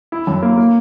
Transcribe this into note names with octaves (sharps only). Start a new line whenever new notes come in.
E4
F#2
A#3
A#3